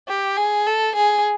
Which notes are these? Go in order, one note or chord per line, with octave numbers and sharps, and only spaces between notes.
G4
G#4
A4
G#4